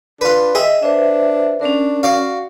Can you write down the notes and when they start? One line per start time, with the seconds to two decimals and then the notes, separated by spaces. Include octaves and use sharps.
0.21 D4 F4 B4
0.55 G#4 D#5 E5 G5
0.83 D4 B4 C5 E5
1.61 C#4 D4 A#4
2.03 F#4 D5 F5